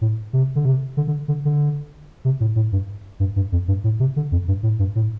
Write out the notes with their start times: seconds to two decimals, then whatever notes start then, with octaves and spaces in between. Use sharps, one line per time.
0.01 A2
0.33 C3
0.55 D3
0.65 C3
0.97 D3
1.07 D3
1.28 D3
1.45 D3
2.25 C3
2.40 A2
2.56 A2
2.72 G2
3.20 G2
3.36 G2
3.52 F2
3.68 G2
3.84 A2
4.00 C3
4.16 D3
4.32 F2
4.48 G2
4.63 A2
4.79 G2
4.96 A2